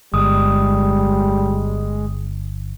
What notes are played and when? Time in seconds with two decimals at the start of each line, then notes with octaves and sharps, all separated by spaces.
0.14 G1 G3 G#3 D#6